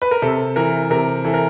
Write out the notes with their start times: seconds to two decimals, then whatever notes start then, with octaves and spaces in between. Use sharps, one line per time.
0.02 B4
0.11 A#4
0.22 C3 A4
0.56 E3 A#4
0.90 C3 A#4
1.25 E3 A4
1.34 A#4